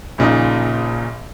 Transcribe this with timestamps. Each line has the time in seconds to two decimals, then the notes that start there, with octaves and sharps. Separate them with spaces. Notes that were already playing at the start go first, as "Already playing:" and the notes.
0.18 A#1 A#2 C#3 D#4